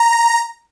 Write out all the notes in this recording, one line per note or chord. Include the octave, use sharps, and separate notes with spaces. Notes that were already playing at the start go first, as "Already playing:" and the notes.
Already playing: A#5